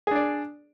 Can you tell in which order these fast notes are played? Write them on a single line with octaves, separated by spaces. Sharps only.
G#4 D4 D5